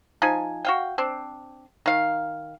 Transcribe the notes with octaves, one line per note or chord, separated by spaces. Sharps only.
F3 D#4 G#5
F#4 F5 G5
C4 D4
D#3 F5